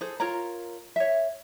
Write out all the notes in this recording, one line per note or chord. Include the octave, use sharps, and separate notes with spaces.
G#4 A4 C5
F4 A#4 C#5 A#5
C#5 E5